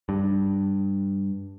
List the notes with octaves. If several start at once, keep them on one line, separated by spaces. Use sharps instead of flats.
G2